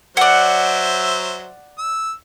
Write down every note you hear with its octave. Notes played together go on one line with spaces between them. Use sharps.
F#3 C5 D5 E5 F#5
E6